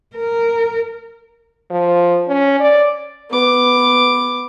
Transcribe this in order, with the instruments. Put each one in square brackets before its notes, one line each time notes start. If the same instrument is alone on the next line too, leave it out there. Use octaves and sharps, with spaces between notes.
[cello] A#4
[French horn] F3
C#4
D5
[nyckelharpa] B3 D6